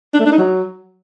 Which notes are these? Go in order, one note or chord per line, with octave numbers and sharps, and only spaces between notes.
D4
A3
D4
D#4
F#3